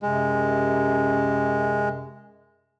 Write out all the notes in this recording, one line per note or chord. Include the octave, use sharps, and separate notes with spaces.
F#2 C3 G#3